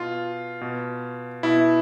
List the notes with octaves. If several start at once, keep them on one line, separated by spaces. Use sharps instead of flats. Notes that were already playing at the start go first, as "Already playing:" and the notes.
Already playing: B2 F4
B2
B2 E4